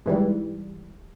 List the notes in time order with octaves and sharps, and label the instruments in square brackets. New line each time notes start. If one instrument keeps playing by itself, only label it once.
[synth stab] G#2 E3 G3